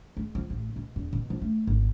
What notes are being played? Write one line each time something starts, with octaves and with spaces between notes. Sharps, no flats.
G#3
F3
A1
B2
E1
B2
F3
A3
G#1